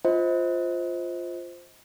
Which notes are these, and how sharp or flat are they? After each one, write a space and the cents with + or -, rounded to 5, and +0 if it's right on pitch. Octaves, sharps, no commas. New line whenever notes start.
F4 +0 C5 +0 D#5 +35